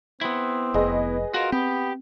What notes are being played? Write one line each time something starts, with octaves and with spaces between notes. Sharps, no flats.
B3 C4 E4
F1 G#4 B4 D#5
F4 F#4 A#4
B3 C4 G4